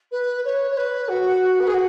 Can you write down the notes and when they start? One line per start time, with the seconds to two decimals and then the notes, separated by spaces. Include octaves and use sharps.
0.11 B4
0.44 C#5
0.71 C#5
0.77 B4
1.08 F#4
1.59 B4
1.67 G#4
1.73 F#4